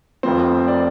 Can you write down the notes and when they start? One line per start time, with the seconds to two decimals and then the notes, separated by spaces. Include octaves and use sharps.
0.23 F1 F2 F3 C4 C5
0.68 D5